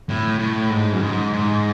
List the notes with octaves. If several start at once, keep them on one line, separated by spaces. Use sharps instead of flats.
A2
A2
G#2
F#2
G#2
G#2